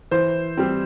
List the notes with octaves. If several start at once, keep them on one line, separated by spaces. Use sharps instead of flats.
E3 C5
G3 C4